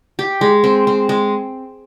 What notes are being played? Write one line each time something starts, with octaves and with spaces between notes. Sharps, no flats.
G4
G#3
C4
C4
G#3